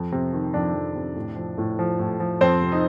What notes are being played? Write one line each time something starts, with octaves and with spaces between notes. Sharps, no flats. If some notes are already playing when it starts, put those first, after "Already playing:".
Already playing: F2
C3
D#3
F2 D4
F2
C3
A2
F3
A2
F3
A2
F3
F2 C4 C5
C3
D#4 D#5